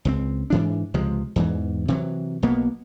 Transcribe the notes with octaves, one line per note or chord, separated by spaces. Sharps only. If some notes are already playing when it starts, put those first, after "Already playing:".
C#2 F3 C4
G#2 E3 D4
C#2 C3 F3 G#3
E2 G#2 E3
C3 E3 F#3
B1 B2 A#3 B3